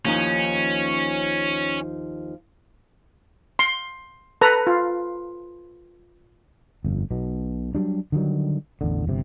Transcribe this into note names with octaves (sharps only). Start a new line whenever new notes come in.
D#2 F3 C#4 D#4
C6
A4 B4 A#5
F4
G1 F2
B1 B2
F#3 G3 D4
D3 D#3 F#3 G3
A1 E2 D3
G1 C3